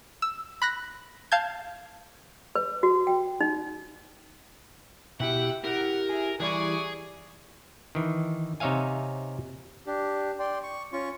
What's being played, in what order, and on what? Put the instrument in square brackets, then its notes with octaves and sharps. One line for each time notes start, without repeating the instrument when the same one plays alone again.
[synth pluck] E6
B5 F#6 A#6
F5 A5 G6 G#6
[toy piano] B4
F#4
G5
D#4
[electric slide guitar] B2 E4 G4 [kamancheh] E5 G5 [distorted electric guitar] F#5
[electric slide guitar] E4 G4 [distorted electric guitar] A#4 [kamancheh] F#5
[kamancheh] G#4 E5
[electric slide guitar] E3 G3 E4 [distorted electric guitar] G#4 [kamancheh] D5 C#6
[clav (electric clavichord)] D#3 E3
C3 D#4 C#5 E5 F5 G#5
[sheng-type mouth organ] D4 G4
D5 G5 C6
C#6
C#4 F4 C#6